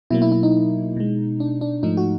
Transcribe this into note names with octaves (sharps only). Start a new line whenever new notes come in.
B2 F#3 A#3 E4
E4
E4
D#4
B2 G#3
D4
D4
G#2 F3 A3 D#4
F#4